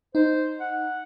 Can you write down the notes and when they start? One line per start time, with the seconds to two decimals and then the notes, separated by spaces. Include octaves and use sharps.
0.15 D#4 C5
0.60 F#5